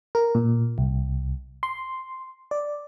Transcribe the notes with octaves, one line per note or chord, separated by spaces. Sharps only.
A#4
A#2
C2
C6
D5